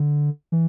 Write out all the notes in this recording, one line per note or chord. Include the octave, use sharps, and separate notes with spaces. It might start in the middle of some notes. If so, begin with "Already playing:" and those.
Already playing: D3
E3